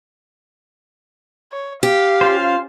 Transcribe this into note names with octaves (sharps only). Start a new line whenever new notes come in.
C#5
G4 F5
C#4 F4 C5